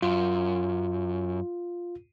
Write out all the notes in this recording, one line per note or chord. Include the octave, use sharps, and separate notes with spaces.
F#2 F4